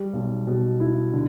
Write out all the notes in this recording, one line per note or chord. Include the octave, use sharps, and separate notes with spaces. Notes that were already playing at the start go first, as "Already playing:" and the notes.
Already playing: G3
B1
B2
E4
D3